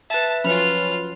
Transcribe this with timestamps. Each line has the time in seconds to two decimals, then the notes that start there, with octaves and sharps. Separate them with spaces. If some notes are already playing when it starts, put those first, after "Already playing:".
0.10 B4 E5 A5
0.44 F3 F#3 C#4 F4 B4 B5 F6